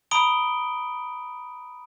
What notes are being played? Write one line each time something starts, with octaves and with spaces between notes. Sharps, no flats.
A#5 B5 D#6 D7 G7